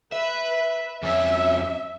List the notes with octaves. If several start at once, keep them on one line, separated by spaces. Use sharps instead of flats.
B4 E5
F2 C#4 E5